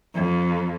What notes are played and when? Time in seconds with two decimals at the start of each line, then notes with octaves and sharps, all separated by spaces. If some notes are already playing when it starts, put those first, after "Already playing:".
0.14 F2